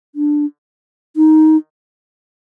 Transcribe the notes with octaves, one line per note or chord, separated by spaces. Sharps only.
D4
D#4